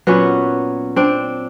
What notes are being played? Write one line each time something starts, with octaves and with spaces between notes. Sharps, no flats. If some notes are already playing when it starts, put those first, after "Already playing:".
A#2 F#3 B3 C#4
C4 D4